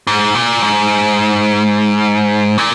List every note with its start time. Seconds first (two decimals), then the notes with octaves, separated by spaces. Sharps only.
0.07 G#2
0.35 A#2
0.63 G#2
2.58 A#2